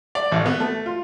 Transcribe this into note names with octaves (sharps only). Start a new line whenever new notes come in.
D5
A1
B3
A3
F4